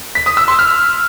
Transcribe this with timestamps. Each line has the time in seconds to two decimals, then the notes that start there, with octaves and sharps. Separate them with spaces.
0.15 B6
0.26 D#6
0.37 E6
0.48 C6
0.59 F6